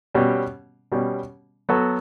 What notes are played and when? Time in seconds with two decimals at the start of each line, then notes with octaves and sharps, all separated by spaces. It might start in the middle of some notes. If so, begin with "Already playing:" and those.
0.15 B2 G3 C#4
0.92 B2 G3 C#4
1.69 F#3 B3 F#4 A4